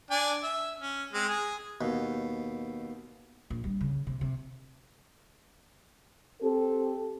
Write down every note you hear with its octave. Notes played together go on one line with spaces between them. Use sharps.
D4 G#5
E5
C#4
G#3 C4
G#4
D#2 B2
A#1
G3
C#3
C3
C3
C4 G4 A4